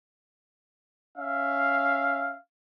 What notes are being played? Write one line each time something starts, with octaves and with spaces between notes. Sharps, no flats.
C#4 E5 F5